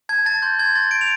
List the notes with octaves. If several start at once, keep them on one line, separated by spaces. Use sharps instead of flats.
A5 G#6
A5 A6
C6 G6
C6 G#6
C6 A6
G6 D7
F7